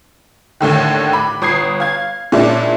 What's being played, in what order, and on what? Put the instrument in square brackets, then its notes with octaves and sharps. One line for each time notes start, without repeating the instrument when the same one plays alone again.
[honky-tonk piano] D#2 A2 D3 D#3
B5 D6
G1 D#6 G#6 C7
F5 G#6
A#2 G#3 C#4 D4 E4